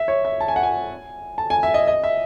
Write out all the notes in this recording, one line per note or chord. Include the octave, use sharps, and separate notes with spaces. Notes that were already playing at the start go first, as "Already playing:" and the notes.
Already playing: E5
C#5
E5
A5
G#5
F#5
G#5
A5
G#5
E5
D#5
D#5
E5